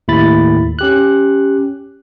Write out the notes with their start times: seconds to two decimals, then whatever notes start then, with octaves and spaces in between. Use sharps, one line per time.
0.08 D#2 A2 E4 B5 A6
0.79 C#4 G4 F#6